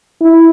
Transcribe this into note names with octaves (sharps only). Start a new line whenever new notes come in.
E4